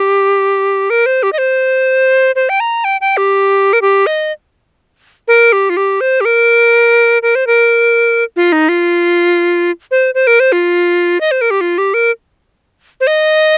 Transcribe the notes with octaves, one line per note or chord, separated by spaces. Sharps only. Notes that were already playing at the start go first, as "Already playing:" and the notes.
Already playing: G4
A#4
C5
G4
D#5
C5
C5
G5
A#5
G5
G5
G4
A#4
G4
D#5
A#4
G4
F4
G4
C5
G4
A#4
A#4
C5
A#4
F4
D#4
F4
C5
C5
A#4
C5
F4
D#5
C5
A#4
G4
F4
G4
A#4
C5
D#5